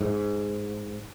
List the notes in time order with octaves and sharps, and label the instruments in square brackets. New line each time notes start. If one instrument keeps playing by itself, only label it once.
[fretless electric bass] G#2